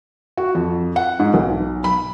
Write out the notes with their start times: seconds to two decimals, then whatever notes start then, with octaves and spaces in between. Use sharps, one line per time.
0.37 F#4
0.55 F2
0.96 F#5
1.19 G#2
1.34 B1
1.84 B5